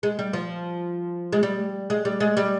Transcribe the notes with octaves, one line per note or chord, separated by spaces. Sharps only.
G#3
G3
F3
G#3
G3
G#3
G3
G#3
G3